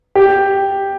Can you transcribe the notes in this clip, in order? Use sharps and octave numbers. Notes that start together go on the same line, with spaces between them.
G4